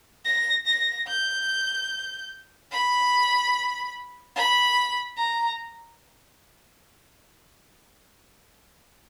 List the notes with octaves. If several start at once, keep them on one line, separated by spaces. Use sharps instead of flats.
A#6
A#6
G6
B5
B5
A#5